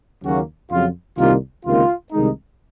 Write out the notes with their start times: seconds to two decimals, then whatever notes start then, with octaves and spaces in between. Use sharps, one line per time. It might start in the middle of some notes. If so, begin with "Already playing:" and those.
0.23 D#2 C#3 F#3 A#3 C#4 F#4
0.71 F2 C#3 F#3 F4
1.18 C2 C3 D#3 A#3 F4
1.65 C#2 C3 D#3 A#3 F4
2.12 C2 C3 D#3 G#3 D#4